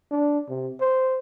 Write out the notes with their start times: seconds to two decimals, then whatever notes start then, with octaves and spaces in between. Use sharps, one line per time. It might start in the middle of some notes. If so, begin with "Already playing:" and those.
0.11 D4
0.49 C3
0.81 C5